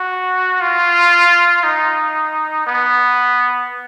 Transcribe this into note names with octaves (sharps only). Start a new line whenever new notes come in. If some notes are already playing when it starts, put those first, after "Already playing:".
Already playing: F#4
F4
D#4
B3